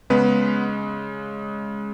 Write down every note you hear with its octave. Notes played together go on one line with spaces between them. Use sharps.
C#3 G#3 B3 B4